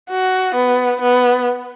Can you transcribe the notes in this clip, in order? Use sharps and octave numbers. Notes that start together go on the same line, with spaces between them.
F#4
B3
B3